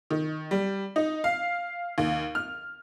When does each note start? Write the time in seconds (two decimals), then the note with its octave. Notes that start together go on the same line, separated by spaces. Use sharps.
0.11 D#3
0.51 G3
0.96 D#4
1.24 F5
1.98 D#2
2.35 F6